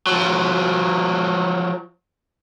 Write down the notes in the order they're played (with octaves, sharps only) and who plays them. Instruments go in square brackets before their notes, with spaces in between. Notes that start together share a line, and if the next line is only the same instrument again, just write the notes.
[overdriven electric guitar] F3 F#3